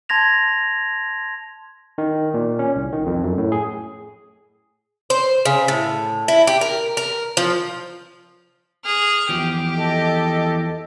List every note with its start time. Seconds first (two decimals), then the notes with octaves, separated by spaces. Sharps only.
0.09 A5 C6 G#6 A#6 F7
1.98 D#3
2.34 A#2
2.59 C#4
2.76 C2
2.93 D#3
3.06 F2
3.24 F#2
3.38 A2
3.52 G#4
5.10 C5
5.45 C#3
5.68 A2
6.28 E4
6.47 G4
6.61 A#4
6.97 A#4
7.37 F3
8.85 G#4 F6
9.30 E2 F3 G4
9.75 A4 D#5